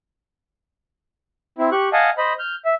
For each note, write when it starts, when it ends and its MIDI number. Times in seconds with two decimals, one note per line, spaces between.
1.58 1.70 60
1.58 1.70 64
1.72 1.89 67
1.72 1.89 85
1.72 1.89 90
1.93 2.10 75
1.93 2.10 77
1.93 2.10 78
1.93 2.10 80
1.93 2.10 81
2.18 2.33 72
2.18 2.33 75
2.18 2.33 83
2.39 2.55 89
2.39 2.55 91
2.65 2.75 76